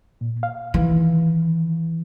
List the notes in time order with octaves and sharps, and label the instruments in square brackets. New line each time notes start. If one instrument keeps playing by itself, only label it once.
[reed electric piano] A#2
F5
[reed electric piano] D#3 [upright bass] E3